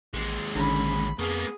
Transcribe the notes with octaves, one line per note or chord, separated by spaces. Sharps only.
A1 D#2 G#3
A1 D3 D#3 C#4 B5
F2 A#3 B3 G#4 A5 C#6